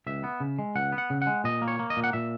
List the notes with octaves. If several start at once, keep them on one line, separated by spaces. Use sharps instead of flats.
C#2 E5
B3
C#3
G#3
C#2 F#5
B3
F#5
C#3
F#5
G#3
A#2 D#5
A#3
C#5
A#3
D#5
A#2
F#5
A#2 E5